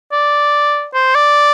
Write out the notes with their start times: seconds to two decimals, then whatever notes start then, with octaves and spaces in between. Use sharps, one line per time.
0.12 D5
0.94 C5
1.15 D5